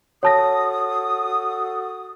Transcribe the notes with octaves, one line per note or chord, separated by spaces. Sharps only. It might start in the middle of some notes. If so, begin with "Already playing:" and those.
F#4 A4 C#5 A5 D#6 A#6